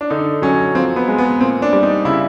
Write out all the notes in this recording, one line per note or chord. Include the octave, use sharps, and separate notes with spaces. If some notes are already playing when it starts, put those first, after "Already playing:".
D4
D3 D#4
F#3 C#4
F3 C4
B3
G#3
B3
A#2 C4
D4
G3
D#4
C#3 E4